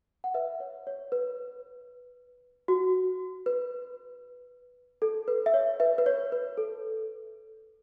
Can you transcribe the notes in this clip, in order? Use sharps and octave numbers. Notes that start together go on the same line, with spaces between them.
F#5
B4 E5
C#5
C#5
B4
F#4
B4
A4
B4
E5
C#5
B4 E5
B4
C#5
B4
A4